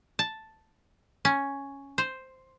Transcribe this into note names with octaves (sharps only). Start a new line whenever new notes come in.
A5
C#4
C5